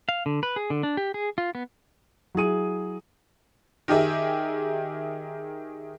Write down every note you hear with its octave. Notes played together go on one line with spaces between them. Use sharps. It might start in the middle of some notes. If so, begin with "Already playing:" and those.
F5
D3
B4
G#4
D3
D4
G4
G#4
F4
B3
F#3 E4 G#4 D#7
D#3 G4 G#4 E5